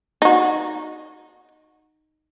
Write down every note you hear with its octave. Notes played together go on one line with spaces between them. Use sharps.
D#4 F#4